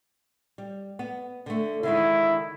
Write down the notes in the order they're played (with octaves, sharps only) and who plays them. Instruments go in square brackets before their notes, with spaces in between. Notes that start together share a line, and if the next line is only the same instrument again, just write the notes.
[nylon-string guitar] G3
B3
D3 A3
[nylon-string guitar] D3 D#3 G#3 [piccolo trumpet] E4